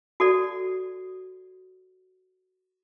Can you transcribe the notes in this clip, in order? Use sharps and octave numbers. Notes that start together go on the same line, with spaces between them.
F#4 A4 D5